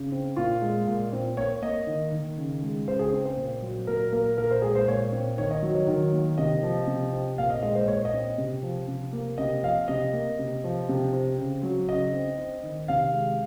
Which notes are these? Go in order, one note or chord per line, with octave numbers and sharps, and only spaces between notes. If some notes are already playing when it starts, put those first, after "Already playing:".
Already playing: C#3
C4
A#2 F4
G#3
A#2
C4
A#3 C#5
A#3 D#5
D#3
D#3
C#3
G#3
C#3 C5
G#4
C4
C5
A#2
F#3
A#2 A#4
A#3 A#4
A#2 A#4
C5
G#3 G#4
C5
A#2 C#5
C4
D#3 C#5
D#5
F#3
C#5
D#3
A#3
C3 D#5
F3
C3
C4
A#2 F5
D#5
G#3 D#5
C5
A#2 C#5
D#5
C4
C3
F3
C3
A#3
C3 D#5
F3 F5
C3 D#5
A#3
C3
F3
C3
C4
C#3
F#3
C#3 D#5
C4
C4
D#3
C3 F5
G#3